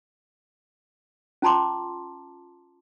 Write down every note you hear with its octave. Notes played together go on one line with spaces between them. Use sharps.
C#4 F4 A5 A#5 C6 D6